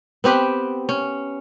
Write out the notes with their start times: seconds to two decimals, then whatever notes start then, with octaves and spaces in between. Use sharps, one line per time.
0.24 B3 C4 G4 B4
0.89 C#4